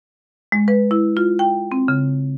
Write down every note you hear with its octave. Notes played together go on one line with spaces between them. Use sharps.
G#3
B4
E4
F4
G5
C4
C#3